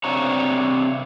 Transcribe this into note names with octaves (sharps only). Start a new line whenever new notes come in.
C3 D4 C#5 A#5